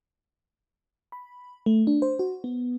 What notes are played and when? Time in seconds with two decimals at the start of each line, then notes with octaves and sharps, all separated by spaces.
1.12 B5
1.66 A3
1.87 D4
2.02 C5
2.19 F#4
2.44 B3